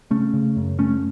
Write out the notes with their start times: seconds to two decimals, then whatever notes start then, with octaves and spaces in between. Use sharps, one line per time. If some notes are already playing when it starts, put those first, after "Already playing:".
0.10 C#3 A3 C#4
0.34 C#3
0.57 F#2
0.79 C#3 A3 C#4